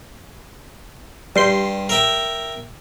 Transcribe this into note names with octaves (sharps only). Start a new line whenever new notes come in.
G2 G3 C6 C7
A#4 E5 G5